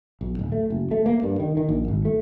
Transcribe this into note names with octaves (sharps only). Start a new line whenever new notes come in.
B1
D1
A3
F#1
A3
A#3
G2
D#3
D#3
A#1
G#1
A3